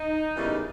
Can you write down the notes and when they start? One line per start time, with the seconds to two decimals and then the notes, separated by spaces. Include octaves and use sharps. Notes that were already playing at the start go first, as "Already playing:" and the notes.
Already playing: D#4
0.36 E2 C#3 E3 G3 A#3